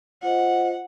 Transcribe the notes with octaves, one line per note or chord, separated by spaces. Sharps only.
F4 C5 D#5 F#5